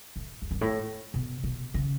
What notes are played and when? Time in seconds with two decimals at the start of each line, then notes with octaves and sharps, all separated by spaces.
0.16 A2
0.42 E2
0.51 F#2
0.61 A2
1.14 B2
1.44 B2
1.74 C#3